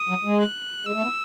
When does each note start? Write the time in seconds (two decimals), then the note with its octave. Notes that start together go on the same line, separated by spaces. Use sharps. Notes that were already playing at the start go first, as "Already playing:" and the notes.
Already playing: D#6
0.09 F#3
0.25 G#3
0.40 F#6
0.86 G#3 E6
0.94 A3
1.03 B3